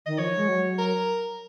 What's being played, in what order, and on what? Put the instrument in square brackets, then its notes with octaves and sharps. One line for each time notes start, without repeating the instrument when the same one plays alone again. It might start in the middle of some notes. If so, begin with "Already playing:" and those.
[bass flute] D#3 [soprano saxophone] D#5
[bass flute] F3 [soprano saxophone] C#5
[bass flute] G#3
F#3
[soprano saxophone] A#4